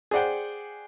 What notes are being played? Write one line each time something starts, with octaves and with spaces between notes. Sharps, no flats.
G#4 C5 D5 F#5 G5